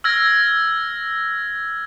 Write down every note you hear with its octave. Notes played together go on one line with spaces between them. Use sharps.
E6 F6 G#6 A#6